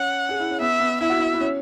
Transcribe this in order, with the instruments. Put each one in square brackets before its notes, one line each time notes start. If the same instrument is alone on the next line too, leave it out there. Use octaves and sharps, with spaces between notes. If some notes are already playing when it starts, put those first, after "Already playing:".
Already playing: [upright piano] C#4 [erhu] F#5
[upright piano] G#4
E4
C#4
[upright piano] B3 [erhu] E5
[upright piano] B3
[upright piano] E4 [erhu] E5
[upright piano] F#4
E4
E4
C#4